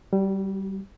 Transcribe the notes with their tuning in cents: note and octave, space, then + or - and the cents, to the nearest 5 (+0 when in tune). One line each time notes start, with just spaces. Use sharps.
G3 -15 F#4 +30